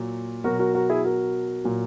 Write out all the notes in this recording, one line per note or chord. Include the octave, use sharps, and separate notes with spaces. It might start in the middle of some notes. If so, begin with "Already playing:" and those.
Already playing: A#2 F#3
B2 F#3 F#4 A#4
F#4 A#4
F#4 A#4
E4 G#4
F#4 A#4
A#2 F#3